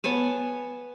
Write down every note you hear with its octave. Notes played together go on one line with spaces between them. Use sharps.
B3 C#5 G#5 A5